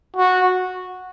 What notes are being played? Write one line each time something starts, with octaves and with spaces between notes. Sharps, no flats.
F#4